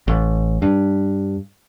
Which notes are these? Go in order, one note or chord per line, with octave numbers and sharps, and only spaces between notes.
A1
G2